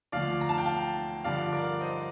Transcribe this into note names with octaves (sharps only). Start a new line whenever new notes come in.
D2 D3 F3 D5 F5
A#5
A5
G5
F5 A5
G2 D3 F3 D5 F5
A#4 D5
C5 D#5